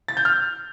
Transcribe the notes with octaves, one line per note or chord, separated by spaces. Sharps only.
A6
G6
F6